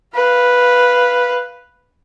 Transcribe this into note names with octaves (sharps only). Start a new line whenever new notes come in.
B4 F5